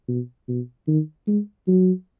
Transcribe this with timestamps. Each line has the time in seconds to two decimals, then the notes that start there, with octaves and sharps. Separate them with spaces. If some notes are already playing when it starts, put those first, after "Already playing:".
0.09 B2
0.49 B2
0.88 D#3
1.27 G#3
1.68 F#3